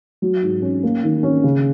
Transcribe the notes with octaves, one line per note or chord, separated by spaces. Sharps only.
F#3
G#2
C#4
A#3
D#3
C#4
C#3